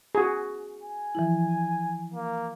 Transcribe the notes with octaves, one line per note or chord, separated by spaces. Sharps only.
F#4 G#4
G#5
E3 F3 E4
A#3